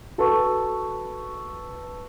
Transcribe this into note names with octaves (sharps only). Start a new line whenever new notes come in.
F#4 A4 B4 A5 C#6